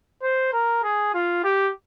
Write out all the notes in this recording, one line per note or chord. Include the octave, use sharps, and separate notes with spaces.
C5
A#4
G#4
F4
G4